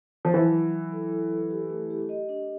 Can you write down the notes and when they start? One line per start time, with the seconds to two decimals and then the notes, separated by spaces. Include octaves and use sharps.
0.25 F3
0.34 E3 F#3
0.54 F#3
0.73 F#3
0.92 A4
1.12 A4
1.31 A4
1.51 G4
1.70 A3
1.90 G4
2.09 D#5
2.29 D4